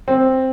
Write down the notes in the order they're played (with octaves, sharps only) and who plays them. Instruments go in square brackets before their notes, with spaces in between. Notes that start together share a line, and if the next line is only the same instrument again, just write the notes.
[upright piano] C4